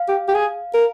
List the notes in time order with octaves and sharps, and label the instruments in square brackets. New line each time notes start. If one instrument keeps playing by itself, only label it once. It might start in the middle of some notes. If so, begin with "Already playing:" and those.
Already playing: [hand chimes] F5
[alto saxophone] G4
G4
G#4
A#4